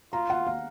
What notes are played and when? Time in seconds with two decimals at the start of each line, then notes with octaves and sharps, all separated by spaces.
0.13 F4 A#5
0.30 F#5
0.47 F5